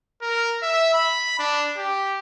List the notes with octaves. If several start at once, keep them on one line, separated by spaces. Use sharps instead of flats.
A#4
E5
B5
D4
G4